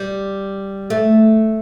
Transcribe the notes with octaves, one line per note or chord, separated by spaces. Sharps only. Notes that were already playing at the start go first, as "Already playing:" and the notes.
Already playing: G3
A3